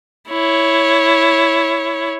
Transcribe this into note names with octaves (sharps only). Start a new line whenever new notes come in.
E4 C#5